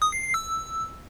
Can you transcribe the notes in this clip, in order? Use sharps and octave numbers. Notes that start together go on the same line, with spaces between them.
D#6
C7
C7
E6